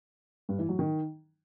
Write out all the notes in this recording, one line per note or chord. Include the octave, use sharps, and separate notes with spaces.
G2
E3
F#3
D#3